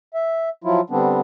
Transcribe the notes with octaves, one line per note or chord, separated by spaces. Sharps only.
E5
F3 F#3 E4 F4
D3 G3 B3 C4 D4